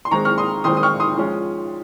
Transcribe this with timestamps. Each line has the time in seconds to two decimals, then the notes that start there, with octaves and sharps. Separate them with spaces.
0.05 C6
0.11 D#3 G#3 C4 A#5 C#6
0.25 C#6 F6
0.38 C6 D#6
0.64 D#3 G#3 C4 C6 D#6
0.77 D#6
0.83 C#6 F6
1.00 C6 D#6
1.18 F3 G#3 C#4